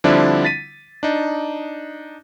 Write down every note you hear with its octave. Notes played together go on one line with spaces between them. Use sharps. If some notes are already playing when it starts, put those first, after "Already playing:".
D3 F3 G3 C4 D4 E4
A6 B6 D#7
D4 D#4